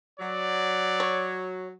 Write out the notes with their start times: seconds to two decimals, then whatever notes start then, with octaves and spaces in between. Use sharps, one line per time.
0.20 F#3 D5
1.00 C#5